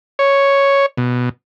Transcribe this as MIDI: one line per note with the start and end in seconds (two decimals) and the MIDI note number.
0.19 0.86 73
0.98 1.29 47